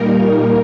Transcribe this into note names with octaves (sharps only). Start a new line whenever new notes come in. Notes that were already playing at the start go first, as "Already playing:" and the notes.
Already playing: A#2 G3 A#3 D#4 A#4